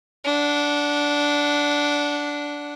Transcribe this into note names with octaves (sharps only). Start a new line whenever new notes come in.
D4 F#5